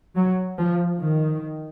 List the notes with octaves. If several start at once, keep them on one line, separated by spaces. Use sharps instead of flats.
F#3
F3
D#3